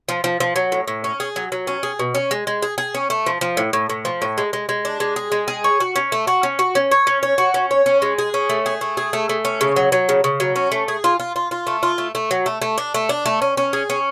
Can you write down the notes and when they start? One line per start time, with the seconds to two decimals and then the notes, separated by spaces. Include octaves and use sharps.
0.09 F3
0.24 F3
0.40 F3
0.56 F#3
0.72 A2
0.88 A2
1.04 C#4
1.20 G#4
1.36 F#3
1.52 F#3
1.67 C#4
1.83 G#4
1.99 B2
2.15 C#4
2.31 G#3
2.47 G#3
2.62 G#4
2.78 G#4
2.94 C#4
3.10 A3
3.26 F3
3.41 F3
3.57 A2
3.73 A2
3.89 A2
4.05 F3
4.22 A2
4.38 G#3
4.53 G#3
4.69 G#3
4.85 D4
5.00 G#3
5.16 G#4
5.32 G#3
5.48 G#4
5.64 C#5
5.80 F#4
5.96 C#4
6.12 A3
6.27 F#4
6.43 C#4
6.59 F#4
6.75 C#4
6.91 C#5
7.07 C#4
7.23 C#5
7.38 F#4
7.54 C#4
7.71 C#5
7.86 C#4
8.02 G#3
8.18 G#4
8.34 C#4
8.50 A3
8.66 G#4
8.81 A3
8.97 G#4
9.13 A3
9.29 A3
9.45 C#4
9.61 C#3
9.76 F#3
9.92 F#3
10.09 C#3
10.24 C#3
10.40 F#3
10.56 C#4
10.72 A3
10.88 G#4
11.04 F4
11.20 F4
11.36 F4
11.51 F4
11.67 A3
11.83 F4
11.98 A3
12.15 A3
12.31 F#3
12.46 A3
12.62 A3
12.78 D4
12.94 A3
13.09 D4
13.26 A3
13.42 C#4
13.57 C#4
13.73 G#4
13.90 C#4